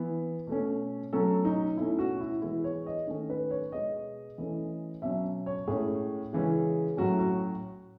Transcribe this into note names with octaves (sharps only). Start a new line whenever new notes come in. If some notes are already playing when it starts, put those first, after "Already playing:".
Already playing: E3 B3
B2 A3 C#4
B2 F#3 A3 C#4 A4
D#4
B2 A3 C#4 E4
F#4
E4
E3 G#3 B3 E4
C#5
D#5
D#3 A3 C#4
B4
C#5
B2 G#3 B3 D#5
E3 A3 C#4
B2 F#3 C#4 E5
C#5
A2 G#3 C#4 G#4
C#3 E3 G#3 C#4
A2 F#3 C#4 F#4
F#4